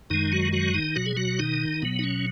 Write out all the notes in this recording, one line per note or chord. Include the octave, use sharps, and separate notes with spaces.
F#2 D#3 G#3 D#4
F#3 F#4
F#3 F#4
D#3 D#4
B2 F#3 F#4
G#4
F#3 F#4
D#3 D#4
B2 F#3 B3
D#4
C#4